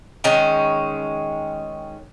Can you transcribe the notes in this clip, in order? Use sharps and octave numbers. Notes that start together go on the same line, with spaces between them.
D#3 G#3 C#4